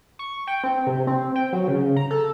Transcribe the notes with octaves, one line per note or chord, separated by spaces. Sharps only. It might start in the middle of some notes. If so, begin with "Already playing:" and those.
C#6
G5
C4
C3
C4
G5
F#3
C#3
A#5
A4